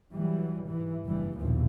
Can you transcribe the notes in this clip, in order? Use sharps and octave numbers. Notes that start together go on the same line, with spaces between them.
E3 F#3 G3
G#2 E3
F#1 G2 E3 G3
A#1 D#2 B2 E3 F3